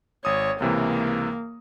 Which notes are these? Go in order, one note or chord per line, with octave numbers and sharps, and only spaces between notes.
G#1 C#5 D#6
C#2 C3 E3 A#3